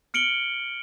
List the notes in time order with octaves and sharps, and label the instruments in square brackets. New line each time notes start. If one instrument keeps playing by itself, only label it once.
[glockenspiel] F6 C#7 D7 F#7 G7